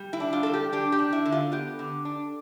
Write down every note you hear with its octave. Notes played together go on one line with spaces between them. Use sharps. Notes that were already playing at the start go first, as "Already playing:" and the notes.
Already playing: G3
E4
D4
F4
G3 A4
G4
D4 G4
G4
D4
E4
D3
F4
B3 G4
D3
D4